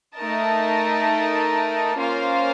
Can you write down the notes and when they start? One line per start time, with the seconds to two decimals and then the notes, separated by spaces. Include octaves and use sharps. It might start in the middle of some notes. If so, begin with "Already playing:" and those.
0.15 A3 D#4 A#4 D#5 A5
1.98 A#3 C#4 F4 C5 F5